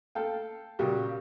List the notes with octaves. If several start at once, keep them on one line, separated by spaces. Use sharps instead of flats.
A4 F5 G5
A#2 C#3 G3 F#4 G4